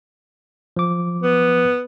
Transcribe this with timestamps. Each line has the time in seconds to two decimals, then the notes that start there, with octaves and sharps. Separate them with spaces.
0.77 F3 D6
1.22 B3